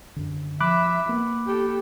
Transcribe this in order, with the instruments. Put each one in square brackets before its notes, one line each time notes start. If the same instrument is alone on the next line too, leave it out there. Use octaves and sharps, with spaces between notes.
[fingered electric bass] F#2 D3
[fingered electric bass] F3 [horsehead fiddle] E5 [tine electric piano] B5 D6 F#6
[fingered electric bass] A#3 [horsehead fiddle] B3
[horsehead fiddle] G4 A4